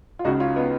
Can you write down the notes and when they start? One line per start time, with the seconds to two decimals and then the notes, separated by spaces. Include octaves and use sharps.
0.19 F4
0.25 C#2 C#3 D#4 F#4
0.40 C#4 F4
0.56 B3 D#4